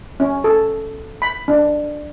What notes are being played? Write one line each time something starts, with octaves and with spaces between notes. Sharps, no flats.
C#4
A4
B5
D4